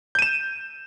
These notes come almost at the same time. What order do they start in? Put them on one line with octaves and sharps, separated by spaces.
G6 D#7 E7